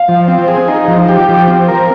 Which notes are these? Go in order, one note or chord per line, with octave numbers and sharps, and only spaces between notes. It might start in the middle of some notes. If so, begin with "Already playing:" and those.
Already playing: F5
F3
C4
G#4
D#4
F3
G4
F3
C4
A#4